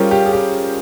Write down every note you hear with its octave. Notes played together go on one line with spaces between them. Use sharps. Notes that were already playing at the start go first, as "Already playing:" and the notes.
Already playing: G3 C#4 F4 G4 G#4 A#4 C5
G4
G#4
G4